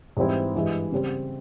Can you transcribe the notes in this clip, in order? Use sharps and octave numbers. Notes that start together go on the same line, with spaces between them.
G#2 E3 G3 C4 E4
G2 E3 G#3
C#3 G3 C4